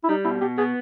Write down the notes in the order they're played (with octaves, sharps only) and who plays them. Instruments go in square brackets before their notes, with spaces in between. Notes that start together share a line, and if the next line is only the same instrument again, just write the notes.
[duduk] E4
[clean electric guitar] G3 [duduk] D#4
[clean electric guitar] B2 [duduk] E4
[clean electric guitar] B2 [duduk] G4
[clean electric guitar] B3 [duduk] G#4